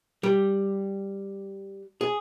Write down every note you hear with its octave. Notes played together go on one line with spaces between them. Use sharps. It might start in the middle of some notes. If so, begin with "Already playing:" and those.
G3
G#4